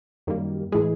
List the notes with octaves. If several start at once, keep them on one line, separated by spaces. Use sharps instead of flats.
F#2 D#3 G3 A#3
A2 E3 G#3 G#4